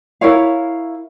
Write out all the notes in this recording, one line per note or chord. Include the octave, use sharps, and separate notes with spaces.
E4 A#4 C#5 F5